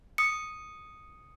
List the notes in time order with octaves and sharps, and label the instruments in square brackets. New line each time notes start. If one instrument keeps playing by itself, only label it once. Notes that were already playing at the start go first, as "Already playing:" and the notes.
[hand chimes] D#6 C#7